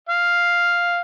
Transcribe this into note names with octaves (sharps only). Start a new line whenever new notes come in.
F5